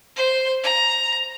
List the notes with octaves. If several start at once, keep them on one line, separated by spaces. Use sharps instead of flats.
C5
A#5